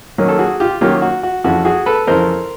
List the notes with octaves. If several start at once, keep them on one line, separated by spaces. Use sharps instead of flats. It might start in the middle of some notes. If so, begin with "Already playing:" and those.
D#3 F#3 A#3 C#4
A4
F#4 G#4
F4 G4
D#3 F#3 A#3 C#4 F4 G4
F#4
F#4
F2 C#3 E3 F#4
F#4 G#4
A4 B4
F2 C#3 E3 A#4 C5